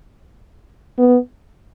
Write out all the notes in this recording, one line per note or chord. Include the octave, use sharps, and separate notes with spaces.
B3